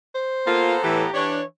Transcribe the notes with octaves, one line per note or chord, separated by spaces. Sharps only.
C5
A#3 B3 F4 A4 A#5
A2 E3 G4
E3 D4 C#5